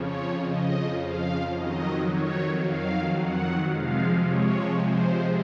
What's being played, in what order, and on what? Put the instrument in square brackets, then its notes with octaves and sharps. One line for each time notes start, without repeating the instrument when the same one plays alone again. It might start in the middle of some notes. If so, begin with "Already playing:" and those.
Already playing: [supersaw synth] F2 C#3 F3 C#5
D#5
F5
F2 D#3 F#3 D#5
C#5
F5
F#5
C3 F3 G#3 F5
C#5
C5